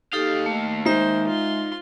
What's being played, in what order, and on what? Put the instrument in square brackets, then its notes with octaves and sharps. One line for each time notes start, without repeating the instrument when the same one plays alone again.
[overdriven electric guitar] D#2 F5 [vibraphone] D#4 G4 A4
[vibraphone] A3
[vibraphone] G#3 E5 [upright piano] D#4 [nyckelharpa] C5
[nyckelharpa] F4 C6